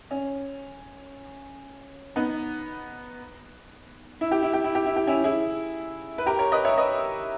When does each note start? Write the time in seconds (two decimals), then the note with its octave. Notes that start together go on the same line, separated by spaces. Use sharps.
0.11 C#4
2.16 B3 D#4
4.21 E4
4.31 G4
4.43 E4
4.53 G4
4.64 E4
4.75 G4
4.86 E4
4.96 G4
5.07 C#4 E4
5.24 E4 G#4
6.18 B4
6.26 G4 A#4
6.39 A#4 C#5
6.52 B4 D#5
6.65 C#5 E5
6.78 B4 D#5